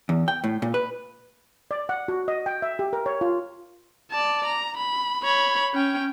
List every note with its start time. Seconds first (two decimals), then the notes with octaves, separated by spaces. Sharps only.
0.09 E2
0.28 G5
0.44 A2
0.62 A#2
0.74 B4
1.71 D5
1.89 F#5
2.08 F#4
2.28 D#5
2.46 G5
2.62 E5
2.79 G4
2.93 A#4
3.06 C#5
3.21 F4
4.11 D5 A5
4.45 A#5
4.77 B5
5.24 C#5 B5
5.74 C#4 G5